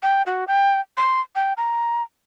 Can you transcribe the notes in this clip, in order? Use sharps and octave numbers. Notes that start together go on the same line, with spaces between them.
G5
F#4
G5
C6
G5
A#5